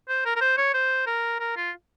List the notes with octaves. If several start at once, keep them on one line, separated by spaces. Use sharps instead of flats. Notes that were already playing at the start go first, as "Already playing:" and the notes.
C5
A#4
A#4
C5
C#5
C5
A#4
A#4
F4